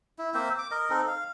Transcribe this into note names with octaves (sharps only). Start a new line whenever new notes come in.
E4
A#3 C4 C5 E5
D6
A#4 D#5
C4 D#4 A4
F5